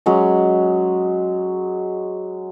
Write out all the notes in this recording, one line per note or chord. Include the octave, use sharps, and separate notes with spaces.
F#3 G#3 C#4